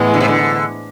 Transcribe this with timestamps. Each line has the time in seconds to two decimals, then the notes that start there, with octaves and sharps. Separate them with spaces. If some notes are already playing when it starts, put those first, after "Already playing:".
Already playing: A2 E3 G#3 B3
0.14 D3
0.21 C3
0.28 D3